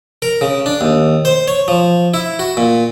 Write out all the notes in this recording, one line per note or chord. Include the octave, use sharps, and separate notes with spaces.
A#4
C#3
D4
D#2
C5
C#5
F3
E4
F#4
A#2